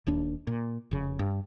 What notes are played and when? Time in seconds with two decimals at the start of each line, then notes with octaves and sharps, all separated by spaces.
0.07 D#1 D#2 D4
0.47 A#2
0.91 F1 C#3
1.19 G2